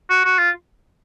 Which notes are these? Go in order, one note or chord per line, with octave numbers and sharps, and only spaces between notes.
F#4
F#4
F4